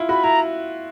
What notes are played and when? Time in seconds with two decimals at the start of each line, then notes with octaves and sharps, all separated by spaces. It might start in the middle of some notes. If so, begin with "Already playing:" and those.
Already playing: E4 F4
0.09 F#4 B5
0.24 E4 A#5